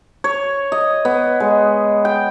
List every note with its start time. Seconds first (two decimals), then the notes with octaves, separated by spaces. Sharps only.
0.24 C#5
0.72 D#5
1.05 B3
1.40 G#3
2.05 G5